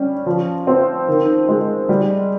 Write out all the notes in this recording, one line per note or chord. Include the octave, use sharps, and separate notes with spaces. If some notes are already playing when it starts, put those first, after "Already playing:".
Already playing: G3 C#4
F3
C4
D#3
G#3
G3